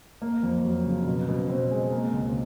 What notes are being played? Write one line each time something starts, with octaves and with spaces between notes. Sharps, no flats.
A#3
F2
F#3
C#3
B2
B2
C4
G#3
A#3
C#2